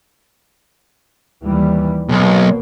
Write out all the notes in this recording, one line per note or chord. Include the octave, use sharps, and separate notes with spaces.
D#2 E3 G3
B1 B2 A#3